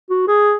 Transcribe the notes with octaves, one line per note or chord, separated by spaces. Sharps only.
F#4
G#4